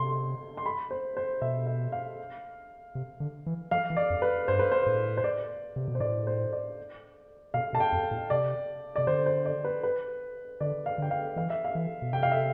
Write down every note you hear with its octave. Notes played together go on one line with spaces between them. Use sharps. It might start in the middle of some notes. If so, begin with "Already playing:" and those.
Already playing: C3 C6
C6
B5
C5
C5
B2 E5
E5
F5
C3
D3
E3
F3 F5
E3
D5
F2
B4
G2 C5
B4
C5
A2
C5
D5
C3
B2
C5
A2 D5
C5
D5
B2 F5
B2 A5
G5
F2
A2
C3 D5
C3 D5
D3 C5
C5
D5
B4
B4
D3 D5
F5
D3 G5
F5
E3 F5
E5
F5
E3
B2
C3 G5
F5
E5